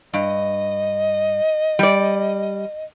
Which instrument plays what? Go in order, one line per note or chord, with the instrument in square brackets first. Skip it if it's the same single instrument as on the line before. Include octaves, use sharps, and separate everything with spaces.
[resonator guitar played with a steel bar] G2 [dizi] D#5
[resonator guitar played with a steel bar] G3 D5